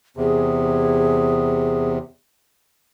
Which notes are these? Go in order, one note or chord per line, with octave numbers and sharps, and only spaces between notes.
E2 C3 G#4